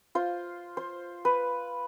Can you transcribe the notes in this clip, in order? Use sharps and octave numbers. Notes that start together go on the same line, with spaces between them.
F4 C5
C5
B4